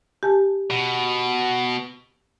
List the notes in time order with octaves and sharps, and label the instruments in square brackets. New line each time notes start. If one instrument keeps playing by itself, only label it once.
[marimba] G4 G#5 A5
[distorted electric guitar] B2